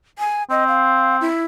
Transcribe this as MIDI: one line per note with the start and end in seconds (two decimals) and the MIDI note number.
0.19 0.43 80
0.50 1.25 60
0.50 0.64 75
0.68 1.17 77
1.21 1.45 64